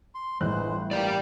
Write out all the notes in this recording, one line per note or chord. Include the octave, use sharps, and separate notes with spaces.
C6
G1 A2 E3 G#3 C5 F#6
A#3 G4 D5